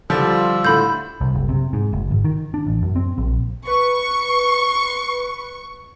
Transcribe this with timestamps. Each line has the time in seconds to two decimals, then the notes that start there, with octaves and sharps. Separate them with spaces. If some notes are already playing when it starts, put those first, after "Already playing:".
0.10 D3 F3 G3 F4 E6
0.65 A2 D3 B5 G6
1.21 C2
1.35 F#1
1.49 C3
1.73 G#2
1.93 F#1
2.11 G#1
2.25 D#3
2.54 D4
2.67 A1
2.82 F#2
2.96 C4
3.18 A#1
3.67 B4 C#6